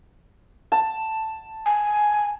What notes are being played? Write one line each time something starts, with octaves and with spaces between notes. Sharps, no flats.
A5
G#5